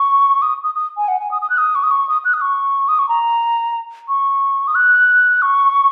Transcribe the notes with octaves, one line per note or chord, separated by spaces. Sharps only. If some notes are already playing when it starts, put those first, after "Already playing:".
Already playing: C#6
D#6
D#6
D#6
G#5
F#5
G#5
D#6
D#6
F#6
D#6
C#6
D#6
C#6
D#6
F#6
D#6
C#6
D#6
C#6
A#5
C#6
D#6
F#6
C#6